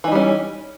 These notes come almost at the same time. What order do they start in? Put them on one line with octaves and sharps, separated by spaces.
E3 D#4 G3 C#4